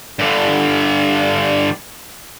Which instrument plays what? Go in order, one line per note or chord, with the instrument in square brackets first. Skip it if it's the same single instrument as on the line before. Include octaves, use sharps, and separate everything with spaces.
[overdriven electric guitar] G2 D3